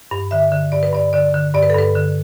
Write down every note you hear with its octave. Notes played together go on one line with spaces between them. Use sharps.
G2
D3 E5
D3
G2 D5
B4
G2 D5
D3 D5
D3
G2 D5
B4
A4
G2 B4
D3